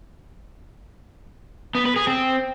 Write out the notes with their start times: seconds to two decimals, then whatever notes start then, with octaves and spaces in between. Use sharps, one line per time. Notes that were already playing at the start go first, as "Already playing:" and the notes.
1.75 B3
1.85 B4
1.96 G#4
2.07 C4